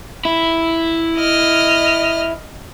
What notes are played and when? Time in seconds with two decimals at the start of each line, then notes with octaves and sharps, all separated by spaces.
0.25 E4
1.18 D#5 F6